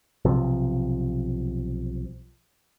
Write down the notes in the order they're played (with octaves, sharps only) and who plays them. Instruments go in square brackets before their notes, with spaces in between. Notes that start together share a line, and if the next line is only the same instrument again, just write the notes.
[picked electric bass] B1 C3 F3